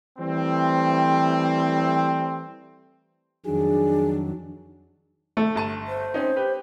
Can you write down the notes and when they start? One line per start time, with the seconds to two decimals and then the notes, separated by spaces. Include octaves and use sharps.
0.18 E3 G3 A3 C4
3.46 F2 D#3 F#3 D4 G#4
5.37 A3
5.55 G1 A5 D#7
5.87 C5
6.14 C4 C#4 D#4
6.36 G4 B4